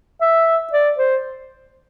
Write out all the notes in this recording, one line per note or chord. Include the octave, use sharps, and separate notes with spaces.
E5
D5
C5